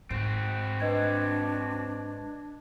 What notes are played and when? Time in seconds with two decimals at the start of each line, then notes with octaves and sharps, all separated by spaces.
0.10 G#2 C4 F#4
0.80 D4 B4 D#5 G#6